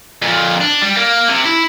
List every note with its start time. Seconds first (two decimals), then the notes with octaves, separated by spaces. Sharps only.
0.22 F2 A#2
0.61 D4
0.82 G3
0.97 A#3
1.29 C3
1.45 E4